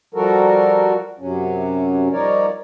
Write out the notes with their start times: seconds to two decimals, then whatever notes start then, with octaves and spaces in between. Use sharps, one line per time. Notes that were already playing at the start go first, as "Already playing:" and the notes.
0.14 F3 G3 F#4 A4 A#4
1.19 F#2 C3 F#3 C#4
2.12 F3 G3 D#4 A#4 C#5 D5